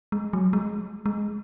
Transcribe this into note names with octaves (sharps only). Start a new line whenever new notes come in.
G#3
F#3
G#3
G#3